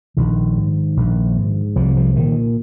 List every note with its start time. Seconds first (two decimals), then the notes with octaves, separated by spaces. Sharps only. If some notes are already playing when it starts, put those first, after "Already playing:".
0.17 A#1 D#3
0.56 G#2
0.97 A#1
1.37 G#2
1.75 C2 F3
1.96 F3
2.15 A#2 D#3